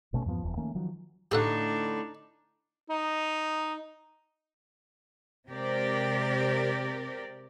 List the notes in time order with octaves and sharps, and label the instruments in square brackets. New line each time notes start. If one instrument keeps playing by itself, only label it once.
[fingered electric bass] G#1 B2 A3 C#4
E2 G2 F3 B3
D#1 E2 F3
D#3 A3 A#3 C#4
D#3 F3 F#3
[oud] A2 D3 [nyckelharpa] D4 D#4 [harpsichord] G4 A4 F#5
[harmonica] D#4
[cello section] C3 G#3 C4 G4 A#4 D5